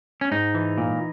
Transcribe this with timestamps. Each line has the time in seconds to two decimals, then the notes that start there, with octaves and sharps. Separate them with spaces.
0.21 C#4
0.31 G#2 D#4
0.55 E3
0.78 A#2